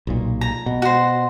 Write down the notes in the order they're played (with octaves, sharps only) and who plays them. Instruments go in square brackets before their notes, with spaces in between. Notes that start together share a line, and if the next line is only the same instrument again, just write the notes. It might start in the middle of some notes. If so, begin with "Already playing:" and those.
[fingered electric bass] B1 A#2
[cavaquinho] A#5
[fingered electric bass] B2
[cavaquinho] F#4 C5